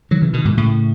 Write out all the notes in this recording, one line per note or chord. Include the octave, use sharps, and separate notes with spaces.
D#3 F#3
C#3 E3
B2 D#3
G#2 B2
A2 C#3